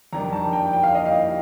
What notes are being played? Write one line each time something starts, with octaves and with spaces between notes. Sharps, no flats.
F2 D#3 G3 D4 A#5
A5
G5
G5
F5
D#5
F5